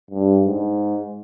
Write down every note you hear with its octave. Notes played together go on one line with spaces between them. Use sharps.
G2
G#2